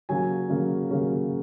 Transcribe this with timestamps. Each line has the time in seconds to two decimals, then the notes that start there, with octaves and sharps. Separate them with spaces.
0.09 C#3 F#3 A#3 C#4 G#5
0.50 C#3 F#3 A#3 C#4
0.91 C#3 F#3 A#3 C#4